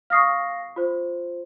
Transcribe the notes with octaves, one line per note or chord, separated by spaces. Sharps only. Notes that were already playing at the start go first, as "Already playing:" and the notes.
F5 C#6 D#6 F6 A#6 C7
F4 C5